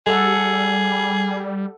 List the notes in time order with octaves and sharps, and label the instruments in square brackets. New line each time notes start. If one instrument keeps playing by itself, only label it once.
[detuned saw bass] G3 [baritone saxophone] G#4 [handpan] A4 F#5